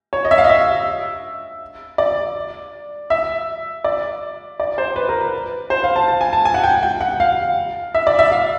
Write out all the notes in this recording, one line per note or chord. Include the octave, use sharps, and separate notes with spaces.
C#5
D#5
E5
F5
D#5
E5
D5
E5
D5
D5
C5
B4
A#4
B4
C5
F5
A5
A5
G#5
A5
G#5
F#5
G5
G5
F#5
F5
E5
D5
E5
F5